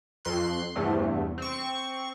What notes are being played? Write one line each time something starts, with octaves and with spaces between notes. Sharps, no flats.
F2 C6 F#6
E2 G2 C3 A3
C4 C#6